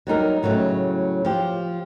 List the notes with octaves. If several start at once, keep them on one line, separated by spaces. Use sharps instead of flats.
F#3 G3 D#4 A#4
A2 C#3 F#3 G3
F3 G4